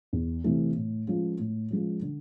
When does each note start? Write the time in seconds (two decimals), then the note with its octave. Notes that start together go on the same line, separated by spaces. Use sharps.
0.13 E2
0.44 C3 E3 A3
0.76 A2
1.07 F3 G#3 C#4 F4
1.39 A2
1.71 F3 G#3 C#4 F4
2.02 D3